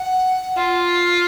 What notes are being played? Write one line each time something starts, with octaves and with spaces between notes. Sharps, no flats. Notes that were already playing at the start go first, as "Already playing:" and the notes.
Already playing: F#5
F4